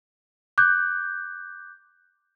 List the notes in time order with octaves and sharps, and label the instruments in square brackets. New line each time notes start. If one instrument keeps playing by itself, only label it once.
[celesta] D6 F#6 G6